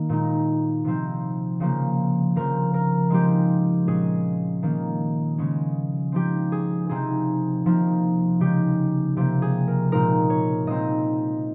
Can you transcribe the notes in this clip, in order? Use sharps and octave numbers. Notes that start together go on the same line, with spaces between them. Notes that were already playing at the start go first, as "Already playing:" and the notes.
Already playing: D#3 A#3
A#2 G#3 D#4
C3 F3 C4 D#4
C#3 F3 A#3
C#3 F3 C4 A#4
A#4
F3 G#3 C4 D#4 G4
A#2 G#3 C#4 G#4
D#3 A#3 C#4
C#3 F3 G#3 C#4
F3 C4 D#4 G4
G#4
C3 F3 C4 D#4 G#4
C3 F3 A#3 D#4
C#3 G#3 D#4 G4
C3 F3 A#3 G4
G#4
A#4
A#2 G#3 C4 D#4 A#4
C#5
A#2 G#3 C4 D#4 D#5